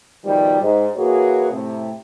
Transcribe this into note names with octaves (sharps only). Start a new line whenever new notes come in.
B2 D#3 F3 G3
G#2
E3 A#3 F#4 G#4 B4 C#5
A2 C3